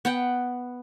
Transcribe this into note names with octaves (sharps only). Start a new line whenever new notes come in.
B3 F#5 G5